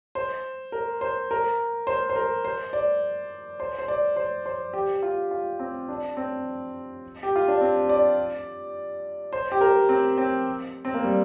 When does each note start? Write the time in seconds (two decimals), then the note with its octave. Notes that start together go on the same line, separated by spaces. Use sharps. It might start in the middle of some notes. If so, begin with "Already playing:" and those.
0.15 C5
0.72 A#4
1.01 C5
1.31 A#4
1.87 C5
2.09 C5
2.16 A#4
2.45 C5
2.73 D5
3.60 C5
3.78 C5
3.88 D5
4.16 C5
4.46 C5
4.73 G4
5.03 F4
5.31 F4
5.59 C4
5.88 D4
6.17 C4
7.23 G4
7.36 F4
7.48 D4
7.61 C4
7.89 D5
9.33 C5
9.52 G4
9.61 A#4
9.89 C4
10.18 C4
10.85 C4
10.94 A#3
11.04 G3